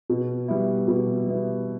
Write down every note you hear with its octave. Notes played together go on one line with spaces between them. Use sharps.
B2
G3 B3 E4
B2
G3 B3 E4